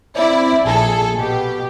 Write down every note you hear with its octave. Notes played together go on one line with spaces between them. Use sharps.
C4 E4 D5
A#1 G#4 A4
B2 G4